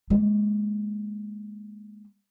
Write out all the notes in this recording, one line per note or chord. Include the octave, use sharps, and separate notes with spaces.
G#3 A#3